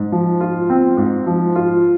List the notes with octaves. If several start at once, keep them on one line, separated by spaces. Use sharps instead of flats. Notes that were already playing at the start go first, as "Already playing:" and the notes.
Already playing: G#2
F3
F4
C4
G#2
F3
F4